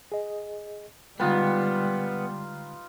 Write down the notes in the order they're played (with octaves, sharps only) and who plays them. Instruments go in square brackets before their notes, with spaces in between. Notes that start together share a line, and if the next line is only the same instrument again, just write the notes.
[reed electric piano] G#4 D#5
[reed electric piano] D3 G#3 G5 [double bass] G3 [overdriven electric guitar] B3 [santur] D#4 F4 B4